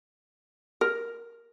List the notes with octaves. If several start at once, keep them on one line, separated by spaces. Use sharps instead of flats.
A#4